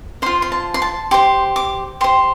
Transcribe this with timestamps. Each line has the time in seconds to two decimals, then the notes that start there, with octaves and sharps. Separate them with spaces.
0.22 F4 C5 C6
0.42 C6
0.52 A5
0.74 C6
0.82 A5
1.11 G4 C5 C6
1.56 D6
2.01 G4 C5 C6